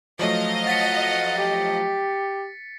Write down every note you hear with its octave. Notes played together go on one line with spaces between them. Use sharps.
F3 F#3 A3 D#5 F5
F#5 A6 B6 C#7
G4